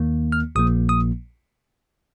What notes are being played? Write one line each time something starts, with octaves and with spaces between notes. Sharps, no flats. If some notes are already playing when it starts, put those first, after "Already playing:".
Already playing: D#2 D#3 A#3
F6
A#1 A#2 F3 A#3 D#6
D#6